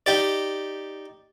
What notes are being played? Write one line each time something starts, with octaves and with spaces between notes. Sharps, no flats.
D#4 G4 D5